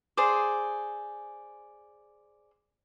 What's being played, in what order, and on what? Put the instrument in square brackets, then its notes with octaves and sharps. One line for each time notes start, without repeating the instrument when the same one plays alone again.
[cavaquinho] G#4 C5 D5